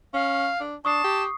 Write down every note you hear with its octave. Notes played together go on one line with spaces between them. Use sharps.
C#4 F5
D4
D4 A5 C#6 D#6 C7
G4